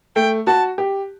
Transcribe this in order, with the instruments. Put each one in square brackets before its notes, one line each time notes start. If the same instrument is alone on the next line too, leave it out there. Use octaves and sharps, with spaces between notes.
[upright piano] A3 [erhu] G5
[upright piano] F#4 [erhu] A5
[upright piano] G4